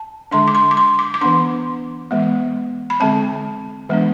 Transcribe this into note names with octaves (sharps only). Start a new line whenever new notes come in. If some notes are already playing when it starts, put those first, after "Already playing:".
Already playing: A5
D3 G#3 D4 C6
D6
C6
D6
C6
D6
D6
E3 B3 D4 C6
E3 G#3 B3
B5
D3 G#3 C4 A5
E3 G#3 B3 D4